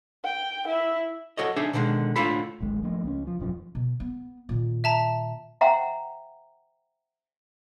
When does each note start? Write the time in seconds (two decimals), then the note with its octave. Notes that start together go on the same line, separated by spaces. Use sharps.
0.25 G5
0.67 E4
1.37 F#4 A4 C#5 D#5
1.56 D4 D#4 G#4 A4 E5 G#5
1.73 B2 D3 D#3 F#3 G#3
2.16 D2 A2 D3 F4 A4 B5
2.61 D1 G#1 G#3
2.83 F3 A3 A#3
3.04 C#2 A#3 C#4
3.27 F3
3.39 E1 F#2 F3
3.75 B2
4.00 B3
4.49 A#2 D#3
4.84 E5 A5 A#5
5.61 C5 E5 F#5 G5 A#5 C6